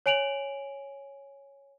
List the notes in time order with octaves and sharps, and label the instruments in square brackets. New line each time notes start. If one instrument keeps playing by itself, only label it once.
[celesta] C#5 G#5 D7 F7 F#7